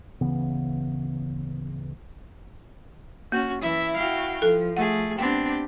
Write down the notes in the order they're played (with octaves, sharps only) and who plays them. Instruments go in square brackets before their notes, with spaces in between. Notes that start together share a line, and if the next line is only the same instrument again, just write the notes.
[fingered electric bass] D1 C#3 E3 B3
[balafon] A#3 [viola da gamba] C#4 F#4
[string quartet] E3 E5 [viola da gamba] E4
[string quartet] F#4 F5 G5
[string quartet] F3 [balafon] A4
[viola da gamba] A3 G#4 [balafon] F#5
[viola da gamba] B3 C4 D4 [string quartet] G4 [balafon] G5